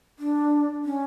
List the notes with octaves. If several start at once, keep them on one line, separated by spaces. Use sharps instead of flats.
D4
C#4